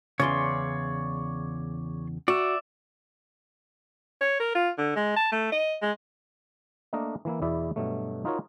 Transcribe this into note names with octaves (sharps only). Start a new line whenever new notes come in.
E2 G2 C#3 C#5 D5 C6
F#4 D5 E5
C#5
A#4
F4
D3
G#3
A5
A3
D#5
G#3
A3 A#3 D4 A#4 D#5
E3 A#3 E4
E2 B2 E4 D5 E5
G2 B2 F#3 A3
D#4 F4 F#4 A#4 C#5